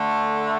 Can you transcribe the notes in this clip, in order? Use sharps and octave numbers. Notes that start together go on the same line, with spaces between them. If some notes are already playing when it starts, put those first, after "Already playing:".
Already playing: D3 A3